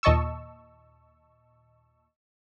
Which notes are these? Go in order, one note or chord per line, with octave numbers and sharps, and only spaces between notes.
D#2 A#2 D#5 A5 C#6 E6